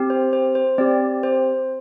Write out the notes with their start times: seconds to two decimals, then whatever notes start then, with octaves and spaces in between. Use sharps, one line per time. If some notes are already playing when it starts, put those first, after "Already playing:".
Already playing: C4 G4
0.10 C5
0.33 C5
0.55 C5
0.78 C4 G4 D5
1.23 C5